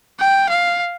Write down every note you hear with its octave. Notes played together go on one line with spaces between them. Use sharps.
G5
F5